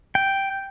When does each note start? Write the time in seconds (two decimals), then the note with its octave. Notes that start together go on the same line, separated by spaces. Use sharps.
0.15 G5